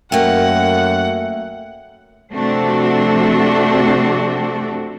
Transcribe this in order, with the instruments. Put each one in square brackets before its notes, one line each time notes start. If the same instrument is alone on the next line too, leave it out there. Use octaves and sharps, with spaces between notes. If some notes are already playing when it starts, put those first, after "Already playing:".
[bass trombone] F#2 [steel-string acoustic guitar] A3 A#3 [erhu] F#5 [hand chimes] G5
[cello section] C3 F3 A3 C4 D4 F#4